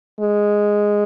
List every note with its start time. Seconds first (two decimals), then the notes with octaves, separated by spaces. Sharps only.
0.20 G#3